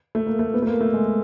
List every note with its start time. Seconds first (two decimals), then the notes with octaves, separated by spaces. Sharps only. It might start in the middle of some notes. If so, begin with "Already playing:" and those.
0.15 A3
0.27 A#3
0.39 A3
0.54 B3
0.62 A3
0.67 A#3
0.81 A3
0.94 G#3